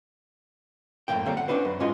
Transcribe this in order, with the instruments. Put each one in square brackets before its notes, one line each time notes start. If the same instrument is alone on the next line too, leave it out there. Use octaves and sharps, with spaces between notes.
[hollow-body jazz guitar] F#2 A2 C3 A#3 G5
D2 G3 A#3 C4 A4 C#5
F#5
C#4 D4 F#4 B4 C5
F#2
G#2 G#3 C#4 F4 F#4 D#5